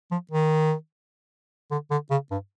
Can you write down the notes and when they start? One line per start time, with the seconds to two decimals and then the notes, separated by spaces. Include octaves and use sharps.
0.11 F3
0.31 D#3
1.71 D3
1.91 D3
2.11 C#3
2.31 G2